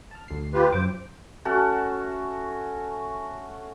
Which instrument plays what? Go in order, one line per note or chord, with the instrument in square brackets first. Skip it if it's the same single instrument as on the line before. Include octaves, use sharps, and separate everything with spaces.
[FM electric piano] A5 F6
D2 C7
[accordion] F4 G4 B4
[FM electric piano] F#2 D6 [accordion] C5
[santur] A3 C#4 F#4 A5